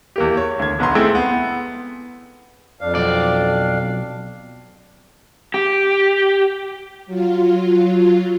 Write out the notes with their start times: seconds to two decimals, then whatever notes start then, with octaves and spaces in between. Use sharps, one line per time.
0.16 E2 A#3 G4
0.37 C#5
0.59 D2 G#6
0.79 E1 B1 B3 B4 A#5 C6
0.95 G#3 A3 C4 E4 G#4 G5
1.15 B3
2.81 F2 D4 F5
2.95 B1 D5
5.54 G4
7.06 F#3 F4